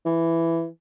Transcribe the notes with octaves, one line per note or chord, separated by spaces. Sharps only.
E3